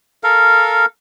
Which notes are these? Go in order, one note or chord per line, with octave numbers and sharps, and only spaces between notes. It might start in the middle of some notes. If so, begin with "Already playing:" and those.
A4 A#4 F5